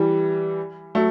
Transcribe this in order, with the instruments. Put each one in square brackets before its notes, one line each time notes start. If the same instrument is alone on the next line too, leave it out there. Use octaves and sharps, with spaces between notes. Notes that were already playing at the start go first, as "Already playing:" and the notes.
Already playing: [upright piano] E3 G3
F#3 A3